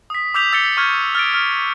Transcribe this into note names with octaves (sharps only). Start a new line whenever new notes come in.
D#6 B6
D6 E6 G6 B6 F7
E6 A6 B6 C#7 G7
C#6 F6 G6 G#6
F6 A6 D7
F6